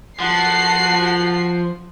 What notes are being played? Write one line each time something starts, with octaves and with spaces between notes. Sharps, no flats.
F3 F#4 F#5 A5 C7